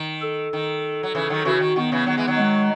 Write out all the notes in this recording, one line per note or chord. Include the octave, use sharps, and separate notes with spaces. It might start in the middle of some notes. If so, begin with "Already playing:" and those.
Already playing: D#3
A4
D#3
F#3
C#3 E3
D#3 F#3
C#3 E3 F#4
D#3
D#3 B3
C#3 E3
D#3 F#3
E3 G#3
D#3 F#3
G#3